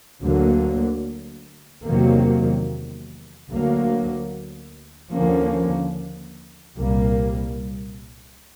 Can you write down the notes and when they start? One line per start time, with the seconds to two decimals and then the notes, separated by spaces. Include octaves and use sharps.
0.22 D2 D3 F#3 A#3
1.86 E2 C3 D#3 F#3 A#3
3.49 D2 D3 F#3 A#3
5.13 D#2 D3 F3 A#3 C#4
6.76 C2 A#2 G3 A#3